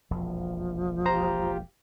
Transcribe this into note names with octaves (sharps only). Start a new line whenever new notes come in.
E1 A#1 F2 F3
F4 G4 C5 A#5